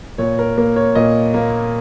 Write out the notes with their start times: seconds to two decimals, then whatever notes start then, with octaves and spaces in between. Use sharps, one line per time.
0.18 A#2 C#5
0.39 A#4
0.57 A#3 A#4
0.76 C#5
0.95 A#2 D#5
1.34 A#3